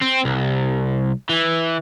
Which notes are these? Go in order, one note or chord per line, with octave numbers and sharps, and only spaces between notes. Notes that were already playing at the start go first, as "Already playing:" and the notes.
C4
C2
E3